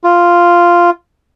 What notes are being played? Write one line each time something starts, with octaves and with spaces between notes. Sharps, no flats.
F4